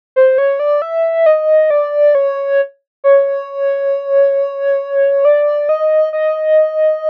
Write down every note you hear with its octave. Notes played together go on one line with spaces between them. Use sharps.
C5
C#5
D5
E5
D#5
D5
C#5
C#5
D5
D#5
D#5